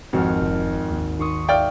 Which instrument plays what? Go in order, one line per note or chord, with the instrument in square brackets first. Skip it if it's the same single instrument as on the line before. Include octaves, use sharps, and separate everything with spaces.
[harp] G#1 F6 [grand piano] F2 [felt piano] C4 F#4
[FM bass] F1
D#2
[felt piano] D#3 [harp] C6 C#6 D#6
[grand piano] D5 F5 G5 [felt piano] E5 F6